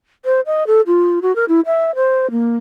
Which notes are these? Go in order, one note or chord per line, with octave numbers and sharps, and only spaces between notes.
C5
D#5
A4
F4
F#4
A#4
E4
E5
C5
A#3